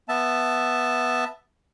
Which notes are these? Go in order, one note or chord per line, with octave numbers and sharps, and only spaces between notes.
B3 E5 A5